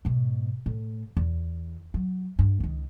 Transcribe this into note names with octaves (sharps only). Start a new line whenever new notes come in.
G#2 B2
A2
E2
F#3
G2
C#2 D#3